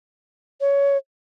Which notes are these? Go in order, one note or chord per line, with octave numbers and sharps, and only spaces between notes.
C#5